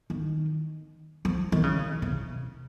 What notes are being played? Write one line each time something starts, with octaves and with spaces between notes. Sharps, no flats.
D#3
F3
D#3
C#3
C3